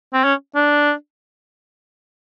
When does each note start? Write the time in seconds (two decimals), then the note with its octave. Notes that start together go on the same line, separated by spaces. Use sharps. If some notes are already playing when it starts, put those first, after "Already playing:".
0.13 C4
0.24 C#4
0.55 D4